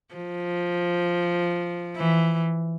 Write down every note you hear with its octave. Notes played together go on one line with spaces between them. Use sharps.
F3
E3